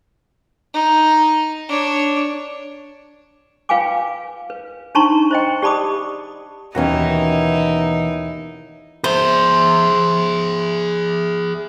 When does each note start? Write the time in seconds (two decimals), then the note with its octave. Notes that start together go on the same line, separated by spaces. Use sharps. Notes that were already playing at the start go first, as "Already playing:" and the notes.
0.74 D#4
1.69 D4 C#5
3.69 F4 B4 F5 G5 G#5 D6
4.50 B4
4.95 D4 D#4 A5 A#5 C6 C#6
5.31 C5 D#5 G5
5.62 G4 D5 A5 B5 D6 D#6
6.75 D#2 B2 E3 C#4 D#4 E4 F#4
9.04 G#4 C5 E5